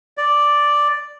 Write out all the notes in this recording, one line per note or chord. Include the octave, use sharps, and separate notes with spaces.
D5